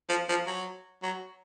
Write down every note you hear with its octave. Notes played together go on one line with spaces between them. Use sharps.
F3
F3
F#3
F#3